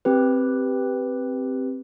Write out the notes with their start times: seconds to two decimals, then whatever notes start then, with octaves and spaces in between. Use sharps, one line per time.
0.05 C4 G4 B4